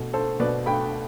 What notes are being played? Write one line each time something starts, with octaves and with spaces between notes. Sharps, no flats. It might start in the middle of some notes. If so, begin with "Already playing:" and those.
Already playing: B2 A3
A3 A4 C5
B2 B4 D5
A3 G5 B5